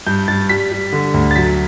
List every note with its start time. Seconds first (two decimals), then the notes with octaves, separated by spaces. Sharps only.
0.06 G2 G6
0.28 G2 A6
0.49 G3 B6
0.71 G3
0.92 D3
1.14 D2
1.31 A6
1.36 F#3 B6